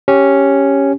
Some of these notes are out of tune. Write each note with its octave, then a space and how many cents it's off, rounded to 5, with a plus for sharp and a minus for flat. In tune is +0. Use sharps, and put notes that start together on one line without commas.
C#4 +0 G4 +0